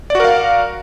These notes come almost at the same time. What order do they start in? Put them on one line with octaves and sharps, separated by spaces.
D5 F#4 A#4 F5